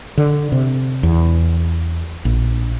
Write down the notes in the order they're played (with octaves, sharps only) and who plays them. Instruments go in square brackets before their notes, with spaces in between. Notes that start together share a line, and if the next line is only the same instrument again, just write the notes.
[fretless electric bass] D3
C3
E2
A#1